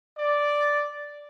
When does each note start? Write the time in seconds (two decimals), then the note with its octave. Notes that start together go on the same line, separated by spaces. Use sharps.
0.18 D5